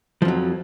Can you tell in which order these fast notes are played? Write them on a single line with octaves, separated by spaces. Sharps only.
F3 F2 F#3